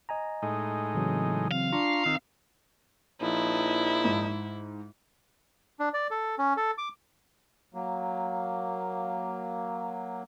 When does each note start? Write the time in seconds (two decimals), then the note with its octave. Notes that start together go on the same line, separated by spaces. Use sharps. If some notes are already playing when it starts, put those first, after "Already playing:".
0.09 D#5 G#5 A#5
0.42 A2 G#3 D#4
0.95 C#3 E3 F#3 C4
1.51 C4 F5
1.73 D4 F4 A#5 C6 C#6
2.06 D#3 C4 E6
3.21 A#1 F3 D#4 E4
4.05 G#2
5.80 D4
5.94 D5
6.11 A4
6.38 C#4
6.57 A4
6.78 D6
7.74 F#3 A#3